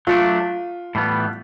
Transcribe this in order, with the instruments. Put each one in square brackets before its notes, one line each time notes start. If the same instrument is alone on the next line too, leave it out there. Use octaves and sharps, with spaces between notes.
[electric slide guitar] F#3 A3 D4 [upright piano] F4
[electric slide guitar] A2 E3 G3 B3